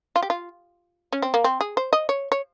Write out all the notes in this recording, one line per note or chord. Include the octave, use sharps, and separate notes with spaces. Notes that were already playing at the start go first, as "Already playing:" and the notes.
F4
G4
F4
C#4
C4
A#3
C4
G#4
C5
D#5
C#5
C#5